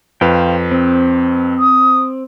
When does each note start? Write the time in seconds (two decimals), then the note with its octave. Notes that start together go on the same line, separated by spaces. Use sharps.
0.21 F2 B4 C5 F5 G5
0.72 C4
1.59 D#6